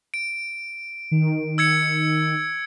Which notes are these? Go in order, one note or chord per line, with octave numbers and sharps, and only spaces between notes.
D7
D#3
E6 G#6 C#7